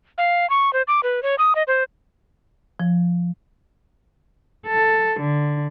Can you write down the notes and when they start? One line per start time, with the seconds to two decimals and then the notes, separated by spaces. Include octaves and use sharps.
0.18 F5
0.50 C#6
0.73 C5
0.88 D6
1.03 B4
1.23 C#5
1.39 D#6
1.55 D#5
1.68 C5
2.80 F3
4.67 A4
5.20 D3